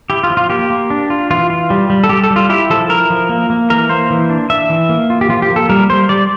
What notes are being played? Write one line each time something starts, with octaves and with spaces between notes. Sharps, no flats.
E4 G4
F4
F3
F4
A#3 G4
A#3
D4
F4
E3 F4
F4
G3
G3
A4
G3 G4
A4
G3
F4
E4 G4
F3 A4
E4 A#4
F3
A#3
A#3
E3 A#4
A#3 C5
E3
D4
D4 E5
E3
A#3
F4
G4
F3 F4
G4
A#3
A4
G3 A#4
G3 C5
G3 D5